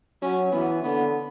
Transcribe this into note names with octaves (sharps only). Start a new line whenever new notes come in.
F#3 C#4
E3 B3
D3 B3